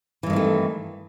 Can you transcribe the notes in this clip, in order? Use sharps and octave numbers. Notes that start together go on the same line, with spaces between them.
G2 D#3 E3 A3 C4